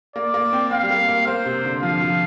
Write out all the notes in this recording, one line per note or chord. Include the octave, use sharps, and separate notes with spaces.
A#3 D5
A#3
C4
C4 F5
G3
A#3
A#3
A#3 C5
C3
D3
F3 F5
F3